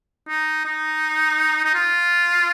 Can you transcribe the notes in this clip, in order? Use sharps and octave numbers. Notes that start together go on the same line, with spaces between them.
D#4
D#4
D#4
F4